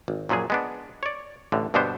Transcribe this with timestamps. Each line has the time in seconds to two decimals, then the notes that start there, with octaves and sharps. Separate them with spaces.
0.08 G#1
0.29 F#2 A#2 F3 F#3 G#4
0.50 G#3 B3 D4
1.03 C#5 D5
1.52 A1 A2 D3
1.74 G2 B2 D3 B3 D4 C5